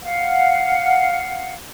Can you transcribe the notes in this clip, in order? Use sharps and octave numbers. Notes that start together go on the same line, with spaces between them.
F5 F#5